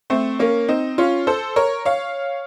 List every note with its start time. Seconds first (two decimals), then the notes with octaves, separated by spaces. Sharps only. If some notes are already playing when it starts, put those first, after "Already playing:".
0.10 A3 C4
0.39 A#3 C#4
0.68 C4 D#4
0.98 C#4 F4
1.27 A4 C5
1.56 A#4 C#5
1.85 C#5 F5